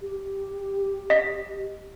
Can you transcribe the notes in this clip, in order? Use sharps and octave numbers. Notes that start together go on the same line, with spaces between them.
G4
D#5 B6